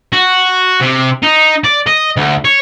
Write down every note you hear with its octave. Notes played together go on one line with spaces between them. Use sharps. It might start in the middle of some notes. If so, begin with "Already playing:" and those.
F#4
C3
D#4
D5
D#5
D2
C#5